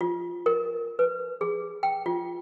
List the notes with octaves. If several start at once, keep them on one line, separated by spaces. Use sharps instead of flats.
F4
A#4
B4
G#4
G5
F4